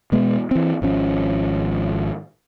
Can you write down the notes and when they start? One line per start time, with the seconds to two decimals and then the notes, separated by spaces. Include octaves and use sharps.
0.12 B2 G#3 B3
0.51 E3 C4
0.82 G#1 F3 C#4